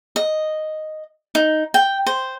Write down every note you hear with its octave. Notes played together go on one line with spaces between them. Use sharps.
D#5
D#4
G5
C5